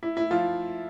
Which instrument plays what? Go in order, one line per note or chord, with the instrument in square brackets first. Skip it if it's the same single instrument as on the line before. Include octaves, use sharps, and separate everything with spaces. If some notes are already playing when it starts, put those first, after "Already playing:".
[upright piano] E4
E4
F3 F4